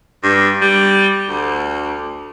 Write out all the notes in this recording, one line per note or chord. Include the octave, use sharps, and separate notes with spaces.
G2
G3
D2